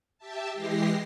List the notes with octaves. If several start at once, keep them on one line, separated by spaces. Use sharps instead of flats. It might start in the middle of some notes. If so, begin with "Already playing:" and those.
G4 E5 A5
E3 G#3 G4 A#6 C7